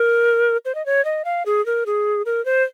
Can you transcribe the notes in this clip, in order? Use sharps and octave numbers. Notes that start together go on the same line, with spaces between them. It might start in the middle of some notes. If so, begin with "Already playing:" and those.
Already playing: A#4
C5
D#5
C#5
D#5
F5
G#4
A#4
G#4
A#4
C5